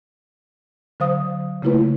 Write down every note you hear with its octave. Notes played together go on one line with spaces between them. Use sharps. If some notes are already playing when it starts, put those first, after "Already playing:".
D3 F#3 C5 F5 D#6
C#3 A3 A#3 E4 F4 B4